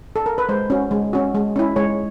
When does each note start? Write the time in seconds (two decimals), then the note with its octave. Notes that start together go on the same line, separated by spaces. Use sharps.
0.16 A4
0.26 A#4
0.38 B4
0.49 G#3 C5
0.70 C#4 F#4
0.91 G#3
1.13 C#4 F#4
1.35 G#3
1.56 C#4 E4
1.76 G#3 C#5